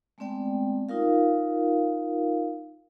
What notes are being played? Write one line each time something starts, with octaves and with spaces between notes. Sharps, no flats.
G#3 A3 B3 C4 D5 G5
D#4 F4 A#4 F5